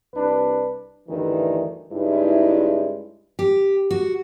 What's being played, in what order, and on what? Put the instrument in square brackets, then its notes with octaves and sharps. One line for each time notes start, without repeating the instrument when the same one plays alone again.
[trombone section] C2 D4 B4
[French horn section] D2 G2 D#3 E3
G2 C#3 G#3 D#4 E4
[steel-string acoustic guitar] G4
F#4